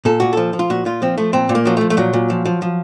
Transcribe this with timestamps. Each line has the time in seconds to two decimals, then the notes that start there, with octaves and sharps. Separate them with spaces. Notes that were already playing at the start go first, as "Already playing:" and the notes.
0.05 A#2 A4
0.20 A#2 F#4
0.33 F3 A4
0.53 F3
0.59 F4
0.70 A#2 F#4
0.85 A#2 F4
1.02 F3 C4
1.18 F3 A3
1.33 A#2 C4
1.49 A#2
1.55 A#3
1.65 F3 F#3
1.77 F3 A3
1.90 A3
1.97 A#2 F#3
2.13 A#2
2.30 F3
2.45 F3
2.62 F3